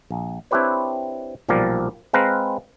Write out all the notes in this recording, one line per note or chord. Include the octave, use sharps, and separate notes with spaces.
A#1
C4 D4 E4 G4 B4 C#5
B1 A#2 F3 G3 A#4 D5
G#3 C4 B4 F5 A#5